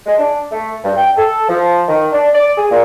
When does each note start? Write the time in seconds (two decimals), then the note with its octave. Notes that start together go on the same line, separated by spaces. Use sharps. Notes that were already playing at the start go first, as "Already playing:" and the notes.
0.07 G#3
0.18 D4
0.51 A3
0.84 G2
0.96 G5
1.17 A4
1.49 F3
1.89 D#3
2.12 D4
2.34 D5
2.56 G#4
2.70 A#2